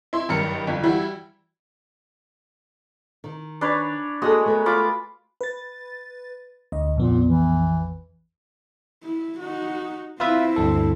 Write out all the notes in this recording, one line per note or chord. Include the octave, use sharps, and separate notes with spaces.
E4 C6
F#1 G2 D#3 A#4 C#7
G1 F2
E3 G3 E4 F#4
D#3
D4 B4 C#5
G#3 A#3 F#4 G#4 A4 D#6
A3 B3 A#4
F4 B5 D6
B4 A6
D2 D#5
A#1 F2 A#2 B3
E3
E4
D#4 F#4
C4 E4 F4 B4 E5
D2 G2 A4